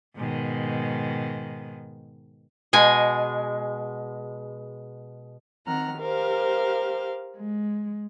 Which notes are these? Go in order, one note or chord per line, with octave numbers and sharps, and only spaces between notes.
G#2 B2 D#3
B2 G#3 G#5
D#3 C4 F#5 A#5 F6
G4 A#4 C5 F5
G#3